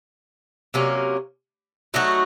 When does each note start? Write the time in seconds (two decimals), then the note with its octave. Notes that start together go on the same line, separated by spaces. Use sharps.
0.74 C3 F#3 A#3 C#4
1.94 F#3 A3 D#4 F#4